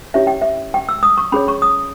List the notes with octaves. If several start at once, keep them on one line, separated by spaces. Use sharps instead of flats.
C#4 E4 G4 C#5 E5
G5
E5
G5
E6
D#6
C#6
C#4 G#4 C#5 B5
C#6
D#6